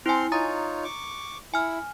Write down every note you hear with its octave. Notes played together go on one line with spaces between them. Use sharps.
C4 E4 G#5 C6 F6
D#4 F4 C#5 A#5 D#6 A6
C#6 D6
E4 G#5 F6